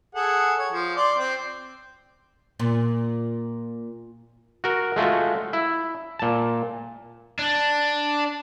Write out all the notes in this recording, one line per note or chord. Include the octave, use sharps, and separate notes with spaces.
G#4 A4 F#5
C#5
F3
D5 C6
C4
A#2
F#4 A#4
G#3 A3 F4 F#4
E4
A#2 A5
D4